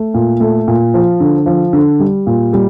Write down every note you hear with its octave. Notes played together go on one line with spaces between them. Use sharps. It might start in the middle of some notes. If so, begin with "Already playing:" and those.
Already playing: A3
A#2
A3
A#2
F3
D3
F3
D3
G3
A#2
G3